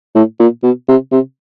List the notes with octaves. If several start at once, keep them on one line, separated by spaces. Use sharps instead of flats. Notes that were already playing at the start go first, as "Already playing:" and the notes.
A2
A#2
B2
C3
C3